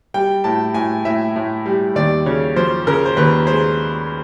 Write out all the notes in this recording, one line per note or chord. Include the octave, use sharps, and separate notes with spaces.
G3 G5
A2 A5
A2 G#5
A2 E5
A2
G3
D#2 D5
C#3 C#5
F3 C5
C#3 A#4
C5
D#2 B4
G#3 C5